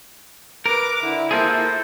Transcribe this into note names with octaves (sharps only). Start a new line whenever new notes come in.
A#4 B4 D6
D3 E4
A#3 F4 G#4 A4 C5